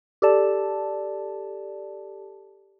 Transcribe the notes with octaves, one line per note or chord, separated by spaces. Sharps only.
G4 A4 D5 A5